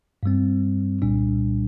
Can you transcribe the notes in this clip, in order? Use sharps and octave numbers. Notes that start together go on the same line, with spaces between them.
G2 G3 C4
C2 A#2 G3 D4